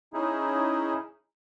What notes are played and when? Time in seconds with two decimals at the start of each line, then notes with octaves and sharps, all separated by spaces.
0.14 C#4 D#4 E4 G#4